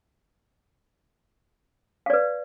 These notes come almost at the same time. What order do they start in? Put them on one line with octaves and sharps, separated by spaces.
F5 D5 B4